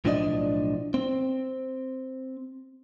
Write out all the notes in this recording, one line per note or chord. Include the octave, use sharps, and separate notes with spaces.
B1 A2 F3 D4 D5 D#5
C4